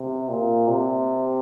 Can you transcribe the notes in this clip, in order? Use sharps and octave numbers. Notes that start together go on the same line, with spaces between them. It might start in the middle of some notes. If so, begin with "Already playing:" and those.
Already playing: C3
A#2
C3